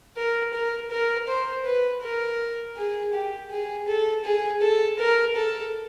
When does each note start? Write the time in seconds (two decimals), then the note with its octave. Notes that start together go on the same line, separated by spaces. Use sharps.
0.17 A#4
0.53 A#4
0.91 A#4
1.27 C5
1.65 B4
2.02 A#4
2.77 G#4
3.13 G4
3.50 G#4
3.87 A4
4.25 G#4
4.61 A4
4.99 A#4
5.36 A4